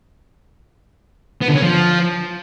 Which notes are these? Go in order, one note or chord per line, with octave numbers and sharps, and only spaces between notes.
B3
D3
C#4
F3